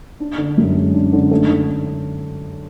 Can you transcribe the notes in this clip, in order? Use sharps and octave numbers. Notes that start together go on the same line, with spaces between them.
D4
D3
F#2
G#3
D4
D3
A3
D3